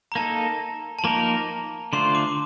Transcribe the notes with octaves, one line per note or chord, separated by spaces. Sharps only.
A#5
A#3 D#4 A4 A5
A5
F3 A#3 D#4 A#4 A#5
D3 A3 D4 F4 C5 C6
D6